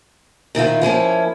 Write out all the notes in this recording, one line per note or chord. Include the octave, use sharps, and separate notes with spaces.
A#2 D#3 E4 F4
F3 A#3 C#4 E4